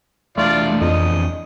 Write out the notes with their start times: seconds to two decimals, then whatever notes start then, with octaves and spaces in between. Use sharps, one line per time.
0.38 E2 A3 D4 F4 D5
0.81 F2 D#5